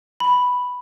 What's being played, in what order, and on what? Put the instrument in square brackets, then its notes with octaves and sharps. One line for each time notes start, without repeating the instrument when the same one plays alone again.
[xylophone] B5